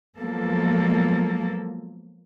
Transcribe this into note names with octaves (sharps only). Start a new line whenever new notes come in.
F3 F#3 G#3 A#3 B3 A4